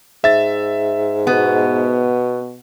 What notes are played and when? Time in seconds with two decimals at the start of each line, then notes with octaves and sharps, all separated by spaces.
0.24 G#2 E5 A6
1.27 B2 B3